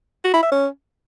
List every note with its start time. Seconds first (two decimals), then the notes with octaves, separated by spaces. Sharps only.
0.24 F#4
0.33 E4
0.43 E5
0.52 C#4